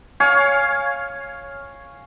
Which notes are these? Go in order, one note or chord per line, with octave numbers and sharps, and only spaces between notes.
C#5 F5 G#5